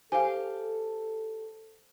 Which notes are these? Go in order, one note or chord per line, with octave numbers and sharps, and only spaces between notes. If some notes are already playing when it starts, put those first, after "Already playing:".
G4 A4 C5 F5 G#5